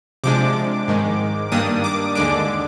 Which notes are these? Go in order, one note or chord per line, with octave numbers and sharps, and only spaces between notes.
C3 F3 G#3 D4 D6
G#2 D#3 G#3
G2 D#3 G3 A#3 D4 D#6
D6
D#2 D3 G#3 D4 D6